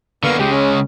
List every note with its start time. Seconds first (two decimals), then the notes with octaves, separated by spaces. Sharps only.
0.23 D3 A#3 B3 F5 C#6
0.39 C#3 G#3 G4
0.50 C#4